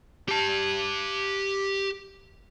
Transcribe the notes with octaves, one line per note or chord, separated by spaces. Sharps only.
G4 A5